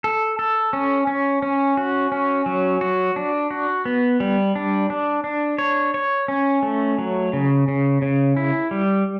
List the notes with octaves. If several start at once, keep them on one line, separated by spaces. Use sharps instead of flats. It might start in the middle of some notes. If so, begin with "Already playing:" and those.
A4
A4
C#4
C#4
C#4
F#4
C#4
F#3
F#4
D4
F#4
B3
G3
D4
D4
D4
C#5
C#5
C#4
A3
F#3
C#3
C#3
C#3
E4
G3